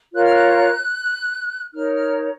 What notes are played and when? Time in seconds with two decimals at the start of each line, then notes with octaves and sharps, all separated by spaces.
0.13 F4 A#4 C#5 F#6
0.23 F6
0.32 F#6
1.74 D#4 A#4 C#5 F6
1.93 F6